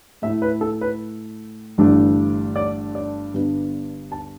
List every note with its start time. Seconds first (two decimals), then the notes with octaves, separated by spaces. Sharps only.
0.22 A2 A3 E4 E5
0.42 B4
0.61 A4
0.81 B4
1.78 G1 G2 E3 A3 D4
2.56 D5
2.95 D5
3.34 G1 G2 D3 B3 D4
4.12 A5